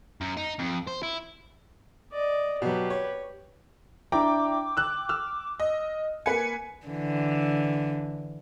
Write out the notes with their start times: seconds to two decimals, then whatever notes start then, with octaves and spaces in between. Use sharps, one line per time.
0.21 F#2
0.37 D#4
0.59 F2
0.87 C5
1.03 E4
2.12 D5 D#5
2.62 B2 F#3 G4 B4
2.90 C#5
4.12 D4 E4 G5 A#5 D6
4.77 E6 F#6
5.09 E6 F6
5.60 D#5
6.26 A#3 B4 G#5 C#7
6.87 D3 E3